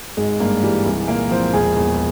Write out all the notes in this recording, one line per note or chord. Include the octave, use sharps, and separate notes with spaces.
G#1 G#3
G2 A#3
E3 G3
C2 G#3
A#2 A#3
F3 C4
E1 G#4
E2